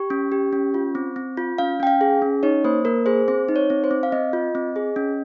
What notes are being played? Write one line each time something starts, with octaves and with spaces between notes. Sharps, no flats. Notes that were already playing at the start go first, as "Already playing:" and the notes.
Already playing: G4 C#6
C#4
G4
C#4
F4
C4
C4
F4
C#4 F5
C#4 G5
F5
G#4
C#4
D#4 C#5
A#3 C5
A#3 A#4
G#4 C5
C4 C5
D#4
C#5
C4
C5
C4
F5
C4 D#5
F4
C4
G#4
C#4